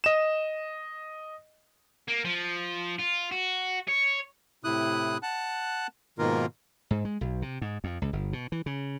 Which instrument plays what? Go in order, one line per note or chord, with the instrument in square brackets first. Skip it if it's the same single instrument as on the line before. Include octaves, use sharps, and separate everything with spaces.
[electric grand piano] D#5 E7
[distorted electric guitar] A#3
F3
F4
F#4
C#5
[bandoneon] A2 C3 E4 D#6 F#6
F#5 A5 F#6
G#2 B2 D#3 A#3 F4 A#4
[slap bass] G#2
G#3
B1
C3
G#2
F2
C#2
G1
B2
E3
C#3